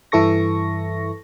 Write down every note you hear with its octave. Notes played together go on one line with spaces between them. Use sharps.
G2 E3 E4 A4 C#6 A#6